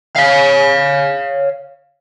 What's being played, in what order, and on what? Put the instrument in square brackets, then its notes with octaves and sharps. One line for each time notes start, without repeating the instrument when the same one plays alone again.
[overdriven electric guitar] C#5 F5